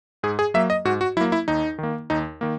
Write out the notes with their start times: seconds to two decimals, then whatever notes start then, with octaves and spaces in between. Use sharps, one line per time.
0.23 G#2 G#4
0.39 G#4
0.54 F#3 A#3 E5
0.70 D#5
0.85 G#2 F#4
1.01 F#4
1.17 F#3 E4
1.21 A#3
1.32 E4
1.48 D#2 D#4
1.78 D#3 A#3
2.10 D#2 D#4
2.41 D#3 A#3